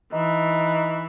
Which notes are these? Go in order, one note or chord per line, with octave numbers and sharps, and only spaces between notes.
E3 D#4